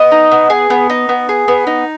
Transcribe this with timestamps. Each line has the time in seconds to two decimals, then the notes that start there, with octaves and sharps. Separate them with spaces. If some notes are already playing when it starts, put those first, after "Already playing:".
Already playing: B3 D#5
0.11 D#4
0.31 B3
0.50 G#4
0.70 B3
0.90 D#4
1.09 B3
1.29 G#4
1.48 B3
1.67 D#4